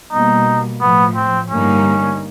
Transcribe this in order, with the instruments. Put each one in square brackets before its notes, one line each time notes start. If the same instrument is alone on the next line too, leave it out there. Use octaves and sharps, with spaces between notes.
[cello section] B2 G3 A#3 [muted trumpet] D#4
[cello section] A2 F3 A3 [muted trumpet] B3
[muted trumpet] C4
[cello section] G2 D3 G3 A#3 D#4 [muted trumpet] C#4